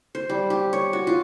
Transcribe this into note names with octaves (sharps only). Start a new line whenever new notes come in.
C5
G3
G4
C#5
F#4
F4